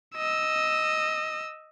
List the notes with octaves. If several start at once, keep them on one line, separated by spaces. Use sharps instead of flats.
D#5 E6